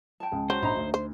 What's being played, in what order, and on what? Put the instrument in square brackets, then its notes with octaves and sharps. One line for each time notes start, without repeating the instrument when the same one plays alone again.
[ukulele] G5 A5
[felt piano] C#2 G#3
[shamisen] F#3 [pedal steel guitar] C5
[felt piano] A#1 B5 [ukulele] D#4 A#5
[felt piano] D2
[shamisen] C5